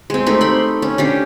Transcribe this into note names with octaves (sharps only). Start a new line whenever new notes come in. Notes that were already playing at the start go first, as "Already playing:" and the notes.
G#3 C4
A3 C4 D#4 G4
B5 C6
C#4
C#4 D4 G4